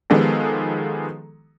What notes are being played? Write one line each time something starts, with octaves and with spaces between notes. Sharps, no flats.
D#3 F3 G#3 B3 G4 A4